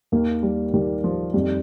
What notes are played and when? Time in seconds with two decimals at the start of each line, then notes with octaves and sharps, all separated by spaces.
0.12 D#2 D#3 A#3
0.43 G3
0.73 D#2 D#3 G3
1.04 F3
1.34 F2 D#3 G3